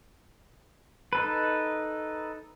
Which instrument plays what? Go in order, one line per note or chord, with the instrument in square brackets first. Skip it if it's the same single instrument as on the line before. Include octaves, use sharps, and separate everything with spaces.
[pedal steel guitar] D#4 A4 B4